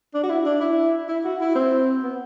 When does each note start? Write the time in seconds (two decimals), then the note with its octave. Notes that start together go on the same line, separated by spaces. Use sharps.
0.14 D4
0.23 F#4
0.30 E4
0.46 D4
0.61 E4
1.09 E4
1.25 F#4
1.41 E4
1.55 C4
2.03 B3